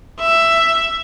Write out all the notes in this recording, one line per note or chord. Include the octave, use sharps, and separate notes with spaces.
E5